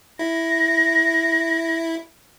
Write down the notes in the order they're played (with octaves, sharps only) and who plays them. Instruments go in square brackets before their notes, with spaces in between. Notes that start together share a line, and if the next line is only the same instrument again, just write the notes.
[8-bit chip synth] E4 [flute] A#6